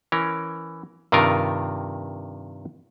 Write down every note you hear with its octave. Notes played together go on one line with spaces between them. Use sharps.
E3 C#4 A#4
G2 C3 D#3 F4 A#4